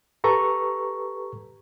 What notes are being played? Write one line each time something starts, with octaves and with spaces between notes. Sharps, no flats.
G4 A4 B4 A#5 C#6